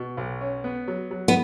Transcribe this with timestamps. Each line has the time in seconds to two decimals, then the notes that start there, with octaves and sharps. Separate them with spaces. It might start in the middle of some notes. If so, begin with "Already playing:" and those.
Already playing: B2
0.17 B1
0.41 C#4
0.64 B3
0.88 F#3
1.11 F#3
1.28 B3